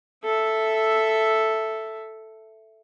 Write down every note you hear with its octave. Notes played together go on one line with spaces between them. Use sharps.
A4 E5